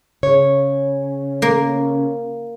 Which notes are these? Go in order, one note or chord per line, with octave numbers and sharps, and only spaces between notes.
C#3 C#5
A#3